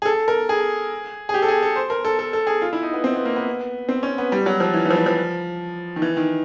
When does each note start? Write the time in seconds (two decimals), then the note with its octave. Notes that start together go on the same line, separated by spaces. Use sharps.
0.02 G#4
0.06 A4
0.28 A#4
0.49 G#4
1.29 G#4
1.34 G4
1.42 A4
1.48 G#4
1.62 A4
1.76 C5
1.90 A#4
2.05 A4
2.19 A4
2.33 A4
2.47 G#4
2.62 F4
2.73 E4
2.83 D#4
2.93 B3
3.04 C4
3.15 B3
3.25 A#3
3.36 B3
3.89 C4
4.03 C#4
4.18 B3
4.32 G3
4.46 F#3
4.60 F3
4.74 E3
4.85 E3
4.90 F3
4.96 E3
5.06 F3
5.96 D#3
6.02 E3
6.17 D#3